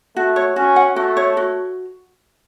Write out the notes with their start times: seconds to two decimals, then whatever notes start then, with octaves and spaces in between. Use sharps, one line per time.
0.16 A3 F#4
0.36 C#5
0.56 C#4 F#4
0.76 F#5
0.96 A3 F#4
1.17 C#5
1.37 F#4